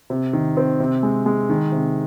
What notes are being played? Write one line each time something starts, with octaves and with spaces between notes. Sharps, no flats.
C3
D#3
C4
C3
G#3
G#3
D#3
C3